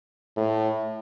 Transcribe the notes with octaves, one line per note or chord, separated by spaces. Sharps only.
A2